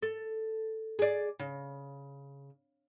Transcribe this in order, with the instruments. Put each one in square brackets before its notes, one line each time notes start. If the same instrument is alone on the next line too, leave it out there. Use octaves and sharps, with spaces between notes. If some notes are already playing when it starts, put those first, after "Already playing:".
[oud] A4
G#4 D5
C#3